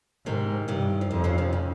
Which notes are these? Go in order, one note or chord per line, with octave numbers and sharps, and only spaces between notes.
G#2 C3 D#3
G2 C3 D#3
F3
F2 D#3 G3
C#3 F3
C3 D#3
C#3